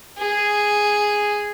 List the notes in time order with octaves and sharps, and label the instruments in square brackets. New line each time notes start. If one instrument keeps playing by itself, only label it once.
[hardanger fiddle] G#4